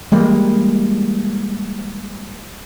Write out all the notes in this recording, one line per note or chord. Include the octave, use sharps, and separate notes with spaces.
E3 G3 G#3 A#3